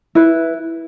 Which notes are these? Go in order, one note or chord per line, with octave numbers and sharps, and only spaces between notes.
E4 B4